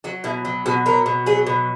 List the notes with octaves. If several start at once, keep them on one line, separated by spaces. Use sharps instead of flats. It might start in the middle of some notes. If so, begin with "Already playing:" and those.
F#3 F#4
B2 E4
F#3
B2 F#4
F#3 A#4
B2
F#3 G#4
B2